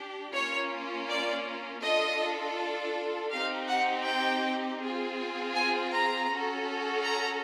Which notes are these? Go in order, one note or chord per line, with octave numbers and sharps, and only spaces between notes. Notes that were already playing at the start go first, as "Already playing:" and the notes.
Already playing: D4 G4
A#3 C#4 F4 C#5
D5
D4 F4 A4 D#5
C4 D#4 G4 F5
F#5
G5
C4 F4 G#4
G#5
A#5
C#4 F#4 A4
A#5